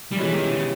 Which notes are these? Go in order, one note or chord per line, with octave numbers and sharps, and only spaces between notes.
G3
B2 E3 G#3 C#4 E4 G4
D#3
C#3